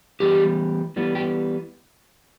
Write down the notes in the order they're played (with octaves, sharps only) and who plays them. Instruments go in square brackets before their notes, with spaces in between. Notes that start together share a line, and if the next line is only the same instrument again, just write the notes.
[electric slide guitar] E3 G3 B3 G4
E3 G3 B3
G4